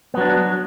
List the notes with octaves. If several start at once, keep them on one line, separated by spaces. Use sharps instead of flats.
F#3 B3 D4